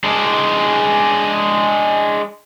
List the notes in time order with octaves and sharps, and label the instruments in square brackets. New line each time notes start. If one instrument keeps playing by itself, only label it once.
[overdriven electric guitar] G#3 D4